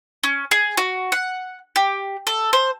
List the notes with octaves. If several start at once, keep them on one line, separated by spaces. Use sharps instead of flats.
C#4
G#4
F#4
F#5
G4
A4
C5